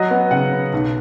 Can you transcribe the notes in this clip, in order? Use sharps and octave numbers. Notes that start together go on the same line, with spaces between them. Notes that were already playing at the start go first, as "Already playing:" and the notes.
Already playing: F#3 D#5
B3
C#3 F#5
B3
B1